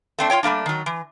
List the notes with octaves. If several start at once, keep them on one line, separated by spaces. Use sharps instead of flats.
A3 C4 D4
F4 G4 C#5 G5
G3 A3 A#3 D4
D#3 F#3
E3